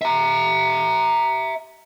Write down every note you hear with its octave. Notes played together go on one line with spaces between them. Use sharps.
E5 A#5